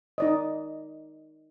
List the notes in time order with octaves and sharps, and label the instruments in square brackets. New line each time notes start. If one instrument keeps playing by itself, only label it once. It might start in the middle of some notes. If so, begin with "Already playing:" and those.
[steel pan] D#4 D5 D#5